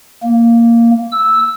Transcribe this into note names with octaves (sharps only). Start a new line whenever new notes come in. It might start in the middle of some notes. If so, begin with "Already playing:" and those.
A#3
E6